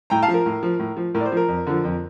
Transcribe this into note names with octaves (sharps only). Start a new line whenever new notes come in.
A2 G5 A#5
F5 A5
F3
A#4
A2
F3
A2
F3
A2 A#4
D5
C5
F3 A#4
F2
D3 F3
F2